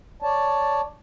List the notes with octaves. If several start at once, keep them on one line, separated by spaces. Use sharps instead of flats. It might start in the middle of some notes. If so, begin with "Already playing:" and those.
C#5 D5 A5